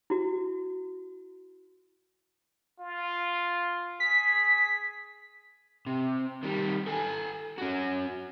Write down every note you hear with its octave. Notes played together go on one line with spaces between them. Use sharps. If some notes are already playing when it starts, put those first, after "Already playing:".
E4 F#4
F4
G#4 B6
C3
D#3 G3
A4 G#5
C#4 F#4